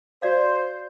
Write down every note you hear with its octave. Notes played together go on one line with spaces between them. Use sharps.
F#4 C5 D5 F5